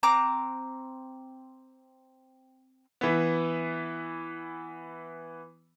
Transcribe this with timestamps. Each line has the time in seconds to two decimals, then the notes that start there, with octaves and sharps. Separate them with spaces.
0.03 C4 A#5 D6 F#6
3.01 E3 B3